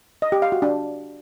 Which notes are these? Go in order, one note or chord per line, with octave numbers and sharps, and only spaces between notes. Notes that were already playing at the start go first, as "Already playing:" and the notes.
D#5
G4
F5
F#4
D4